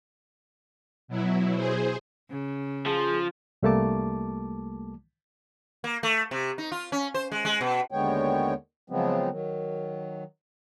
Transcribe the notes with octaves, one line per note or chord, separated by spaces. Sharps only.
B2 F#3 E4
G#4 C5
C#3
F3 G#4
C2 G3 A3 A#3 A5 D6
A#3
A3
C3
D#4
F4
C#4
C5
G#3
G#3
B2
D#2 D3 G#3 B3 C#5 G5
C#3 F3 F#3 G#3 B3 C4
D#3 F#3